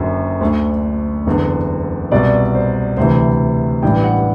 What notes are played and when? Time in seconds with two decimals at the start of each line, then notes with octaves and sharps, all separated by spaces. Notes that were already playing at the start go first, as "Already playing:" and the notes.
Already playing: F#1 F#2 D3
0.41 D2 D3
1.26 F#1 E2 D3
2.12 C2 B2 D5
2.55 C5
2.97 D2 C3 E3 C5
3.83 A1 G2 E3 G5
4.04 F#5